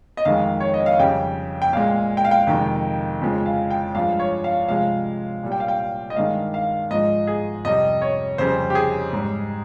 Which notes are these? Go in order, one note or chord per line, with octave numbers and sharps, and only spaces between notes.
D#5
F2 D#3 G#3 F5
C#5
D#5
F5
F2 C#3 G3 G5
G5
A#2 G#3 F5
G5
F5
G5
F2 C3 D#3 G#3
F2 C#3 F3 G#3
F5
G5
G2 F3 G#3 F5
C#5
F5
C3 F3 G#3 F5
A#2 G3
G5
F5
G5
D#5
G2 D#3 G#3 F5
F5
G#2 F3 G#3 D#5
G#4
F2 C3 G3 D#5
C#5
F2 C#3 G3 C5
G4
G#4
G#2 G3